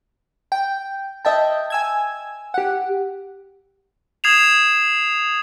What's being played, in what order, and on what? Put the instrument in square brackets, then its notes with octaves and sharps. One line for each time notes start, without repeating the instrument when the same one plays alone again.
[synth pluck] G5
D#5 E5 G5 A5
G#5 E6 G#6
G4 F#5
[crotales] D#6 G#6 C7 E7 F7